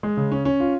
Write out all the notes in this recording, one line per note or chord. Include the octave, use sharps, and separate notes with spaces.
G#3
C#3
C#4
C#4
F4